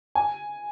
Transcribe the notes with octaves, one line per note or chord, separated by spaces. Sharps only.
G#5